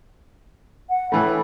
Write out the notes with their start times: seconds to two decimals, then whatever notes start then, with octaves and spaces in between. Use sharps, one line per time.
0.89 F#5
1.12 A2 E3 A3 B5